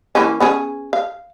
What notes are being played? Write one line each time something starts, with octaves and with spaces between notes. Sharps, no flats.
E3 A#3 C#4
B3 C#4 G#4
F5